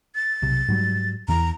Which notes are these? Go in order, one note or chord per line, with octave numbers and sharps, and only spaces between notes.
A6
B1 C3
G#2 F#3 G3
E2 E3 A#5